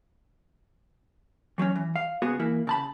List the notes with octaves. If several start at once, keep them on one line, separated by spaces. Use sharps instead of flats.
E3 F#3 C4 C#4
E3
F5
C#3 B3 F#4 G#4
E3 A#3 E4
C#3 A5 B5